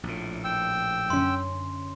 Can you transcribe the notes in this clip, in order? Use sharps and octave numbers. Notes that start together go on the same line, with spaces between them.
A#1 A2
G5 E6
F#2 D3 C#4 C6